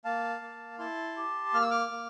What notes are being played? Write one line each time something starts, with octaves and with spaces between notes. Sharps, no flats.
A#3 F5 A5
A#3
E4 A5 C6
G4
A#3 F6
E6
D6 F6
A#3